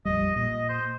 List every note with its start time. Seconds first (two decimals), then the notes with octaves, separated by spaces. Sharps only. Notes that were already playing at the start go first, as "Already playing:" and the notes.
0.05 A#1 F2 G3 D#5
0.36 A#2 D#5
0.69 C5